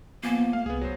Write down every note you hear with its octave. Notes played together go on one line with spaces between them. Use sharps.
F3 A#3 B3 G#5
A3 F5
C2 B3 G#4
F#3 C5